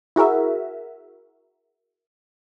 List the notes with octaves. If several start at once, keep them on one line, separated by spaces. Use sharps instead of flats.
E4 F#4 G#4 A#4 E5